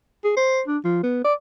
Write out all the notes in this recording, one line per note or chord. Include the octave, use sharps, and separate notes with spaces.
G#4
C5
D4
F3
B3
D5